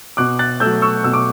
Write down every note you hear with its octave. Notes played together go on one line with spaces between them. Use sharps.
B2 D6 F#6
F#6 A6
F#3 A3 E6 G6
C#6 E6
B2 E6
D6